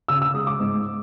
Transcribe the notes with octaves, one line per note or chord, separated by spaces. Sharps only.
C#3 E6
E6
G#3 D#6
D6
G#2